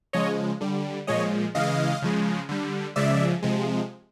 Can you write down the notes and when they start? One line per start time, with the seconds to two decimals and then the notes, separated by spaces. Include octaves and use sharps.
0.13 C#3 F3 G#3 C#5 D#5
0.61 D3 G3
1.07 A#2 F3 G#3 C#5 D#5
1.55 C#3 E3 G#3 D#5 F5
2.02 C#3 F3 G#3
2.49 D3 G3
2.96 C#3 F3 G#3 D5 E5
3.42 C3 F3 G#3